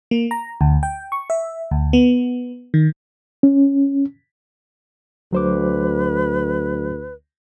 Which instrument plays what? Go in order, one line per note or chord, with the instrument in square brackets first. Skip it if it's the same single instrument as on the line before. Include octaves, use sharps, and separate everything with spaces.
[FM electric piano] A#3
A#5
D2
G5
C#6
E5
D2
B3
D#3
[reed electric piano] C#4
[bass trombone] D2 [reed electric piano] F#3 C5 D6 [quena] B4